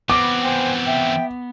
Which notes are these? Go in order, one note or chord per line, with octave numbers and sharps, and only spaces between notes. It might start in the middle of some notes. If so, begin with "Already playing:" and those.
E3 B3 C4 D6
C5 G5 G#5
E5 G5